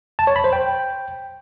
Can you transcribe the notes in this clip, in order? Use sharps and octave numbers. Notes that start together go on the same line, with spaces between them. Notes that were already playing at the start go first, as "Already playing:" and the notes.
A5
C#5
B5
C5
G5